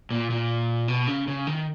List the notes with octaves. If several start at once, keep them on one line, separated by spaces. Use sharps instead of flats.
A#2
A#2
B2
C#3
C#3
D#3